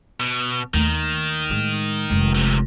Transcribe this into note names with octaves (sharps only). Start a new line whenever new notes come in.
B2
D#2 D#3 A3
A2 G#3
F1 G#3
C3 D#3